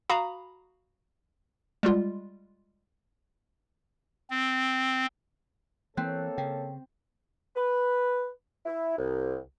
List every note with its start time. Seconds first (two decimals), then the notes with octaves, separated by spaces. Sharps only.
0.10 F#4 F5 A#5 B5 D#6
1.83 G3 G#3 F4
4.30 C4
5.97 E3 A#3 C4 A4 C#5 F#6
6.38 C#3 G5
7.56 B4
8.66 E4
8.98 C2